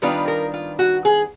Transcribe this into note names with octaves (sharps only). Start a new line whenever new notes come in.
D#3 G3 B3 D4 F4 B4
A#4
F4
F#4
G#4